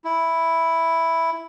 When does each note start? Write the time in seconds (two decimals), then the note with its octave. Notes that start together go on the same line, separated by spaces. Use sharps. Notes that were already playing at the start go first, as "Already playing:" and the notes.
0.04 E4